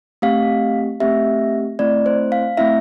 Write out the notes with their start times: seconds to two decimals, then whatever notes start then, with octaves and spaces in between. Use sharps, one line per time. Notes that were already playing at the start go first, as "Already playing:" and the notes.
0.22 A3 C4 G4 F5
1.00 A3 C4 G4 E5
1.79 A3 C4 E4 D5
2.06 C5
2.32 F5
2.57 A3 C4 E4 E5